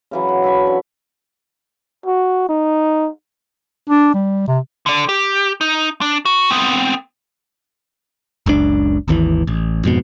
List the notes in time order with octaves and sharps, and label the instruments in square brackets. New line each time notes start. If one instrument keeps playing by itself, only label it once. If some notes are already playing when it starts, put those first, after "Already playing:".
[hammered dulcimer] C#3 E3 F#3
F#5
E5 A5 B5 C#6
D3
[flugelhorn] F#4
D#4
[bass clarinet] D4
G3
C3
[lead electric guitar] D3 D5
G4
D#4
D4
F#4
B3 C4
[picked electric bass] F#1 C#2 A#2 D4
G#1 D#2 D3 E3
A1
F2 G#2 B2